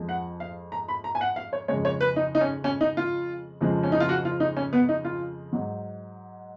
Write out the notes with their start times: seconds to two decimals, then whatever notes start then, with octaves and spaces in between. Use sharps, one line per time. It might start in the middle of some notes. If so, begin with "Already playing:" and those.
Already playing: F2 F3 G#3
0.09 F#5
0.40 F5
0.72 A#5
0.88 B5
1.04 A#5
1.15 G#5
1.21 F#5
1.36 F5
1.53 C#5
1.68 F2 C#3 G#3 C#5
1.85 C#5
2.01 B4
2.16 D#4
2.35 D#4
2.41 C#4
2.64 C#4
2.81 D#4
2.97 F4
3.61 F2 C#3 F3 G#3
3.83 C#4
3.92 D#4
4.00 F4
4.09 F#4
4.25 F4
4.40 D#4
4.57 C#4
4.73 B3
4.89 D#4
5.05 F4
5.53 G#2 F#3